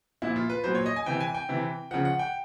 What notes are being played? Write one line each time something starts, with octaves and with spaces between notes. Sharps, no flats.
A#2 F3 E4
F4
B4
A#2 F#3 C5
C#5
D#5
G#5
C3 E3 G5
G#5
G5
C3 E3
C#3 F3 F#5
F#5
G5